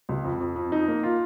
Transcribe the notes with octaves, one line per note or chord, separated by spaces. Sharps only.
C#2
F2
F2
F2
D#4
A#3
F4